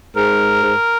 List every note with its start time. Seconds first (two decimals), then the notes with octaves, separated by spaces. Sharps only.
0.16 G#2 A#4
0.63 G#2